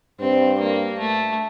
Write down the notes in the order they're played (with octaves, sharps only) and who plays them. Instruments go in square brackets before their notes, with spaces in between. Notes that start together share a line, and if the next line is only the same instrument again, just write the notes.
[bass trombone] G2 [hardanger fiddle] C4
[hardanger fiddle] A#3
A3